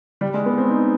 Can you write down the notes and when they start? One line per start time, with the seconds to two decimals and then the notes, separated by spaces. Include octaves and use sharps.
0.21 G3
0.34 G#3
0.46 B3
0.58 C4
0.70 D#4